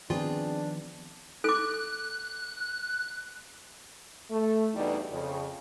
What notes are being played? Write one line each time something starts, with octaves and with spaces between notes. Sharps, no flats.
D#3 F3 B3 C4 D4 F4 G#4
A4 D6 F#6
A3
E2 B2 G3 A3 D4 D#4
F2 C#3